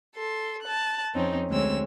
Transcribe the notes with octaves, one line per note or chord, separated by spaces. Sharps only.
A4 C6
A5 F#6
F2 C4 C#4 D#4
D2 G#3 C4 C#5 E6